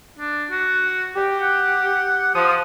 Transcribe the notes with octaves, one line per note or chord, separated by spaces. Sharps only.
D4
F#4
G4
F#5
F3 D#6